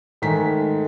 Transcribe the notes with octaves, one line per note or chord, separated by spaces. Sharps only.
G#2 D#3 A3 G#5 B6